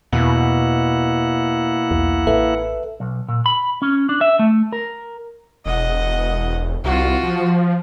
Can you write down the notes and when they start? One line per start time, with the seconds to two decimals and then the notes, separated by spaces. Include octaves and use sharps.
0.13 E2 B2 A#3 E4 F#5
1.91 B1 E2
2.27 A1 A4 B4 E5
3.00 B1
3.28 A#2
3.46 B5
3.82 C#4
4.09 D4
4.21 E5
4.39 A3
4.73 A#4
5.65 E1 D#5 F#5
6.84 C2 F4 F#4
7.23 F3